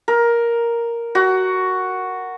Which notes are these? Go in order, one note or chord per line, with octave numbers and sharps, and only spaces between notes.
A#4
F#4